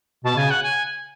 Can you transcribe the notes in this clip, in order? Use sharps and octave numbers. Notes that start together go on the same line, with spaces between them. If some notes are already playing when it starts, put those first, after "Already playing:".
B2 A5
C#3 G#5
F#5
G#5